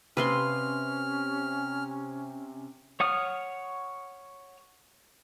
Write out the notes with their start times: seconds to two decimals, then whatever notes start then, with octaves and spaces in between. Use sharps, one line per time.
0.17 C3 C#4 B4 F5 C6 F6
3.00 C#5 F#5 D#6 F6